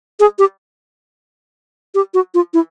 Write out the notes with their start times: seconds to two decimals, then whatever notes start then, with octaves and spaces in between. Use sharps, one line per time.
0.20 G#4
0.39 G4
1.95 G4
2.14 F#4
2.34 F4
2.54 E4